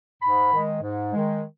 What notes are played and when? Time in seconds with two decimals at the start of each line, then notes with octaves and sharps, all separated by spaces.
0.22 G#2 B5
0.52 D#3 G#3
0.82 G#2
1.13 D#3 G#3